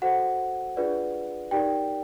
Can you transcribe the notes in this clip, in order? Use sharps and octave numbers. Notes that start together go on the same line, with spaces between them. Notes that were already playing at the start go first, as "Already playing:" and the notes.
F#4 A4 C5 F#5
D4 F4 G#4 B4 D5
D#4 G4 A#4 D5 G5